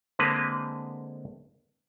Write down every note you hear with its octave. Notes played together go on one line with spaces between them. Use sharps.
D3 G#3 A#3 C4 B4